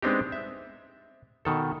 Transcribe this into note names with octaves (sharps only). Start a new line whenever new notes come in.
G#3 B3 C4 D4 D#4 G4
E5
B2 D#3 A4